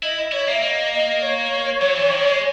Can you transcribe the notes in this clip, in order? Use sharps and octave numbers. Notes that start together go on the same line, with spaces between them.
E4 D#5
D#5
E4 C#5
A#3 E5
A#3 D#5
D#5
C#5
F#3
E3
D#3
G#3